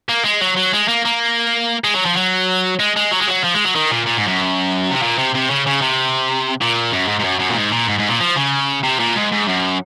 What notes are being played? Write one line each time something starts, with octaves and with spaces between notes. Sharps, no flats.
A#3
G#3
F#3
F#3
G#3
A#3
A#3
G#3
F#3
F3
F#3
G#3
G#3
F#3
G#3
F#3
F3
G#3
F#3
D#3
A#2
A#2
G#2
F#2
C3
A#2
C3
C3
C#3
C#3
C3
A#2
F#2
G#2
G#2
F#2
F#2
A#2
G#2
A#2
G#2
G#2
A#2
F3
C#3
C3
A#2
G#2
G#2
F#2